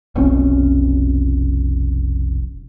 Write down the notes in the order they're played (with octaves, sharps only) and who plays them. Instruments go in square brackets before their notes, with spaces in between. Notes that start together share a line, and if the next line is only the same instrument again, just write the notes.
[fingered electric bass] F1 B1 C4 C#4